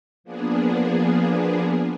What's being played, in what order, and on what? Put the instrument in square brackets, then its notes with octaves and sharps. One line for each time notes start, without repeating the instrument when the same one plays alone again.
[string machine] F3 A#3 B3 D4 G#4